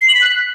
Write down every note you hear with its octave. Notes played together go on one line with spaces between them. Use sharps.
C7
F#7
B6
F#6